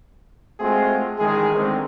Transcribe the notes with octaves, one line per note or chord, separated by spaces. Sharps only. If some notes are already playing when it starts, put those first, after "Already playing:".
G#3 A3 C4 F4 F#4 G#4
A1 D#3 G#3 G#4
D3 D#3 G#3 A3 C4